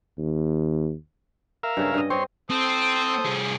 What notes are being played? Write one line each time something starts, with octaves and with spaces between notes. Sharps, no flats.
D#2
A#4 E5 F5
G2 C#3 C#4
G2 D#5
C4 C#5 D#5 C6
C4 A4 C5 D#6
C2 G#4